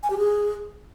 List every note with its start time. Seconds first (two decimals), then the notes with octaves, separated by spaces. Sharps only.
0.03 G#5
0.10 G4
0.18 G#4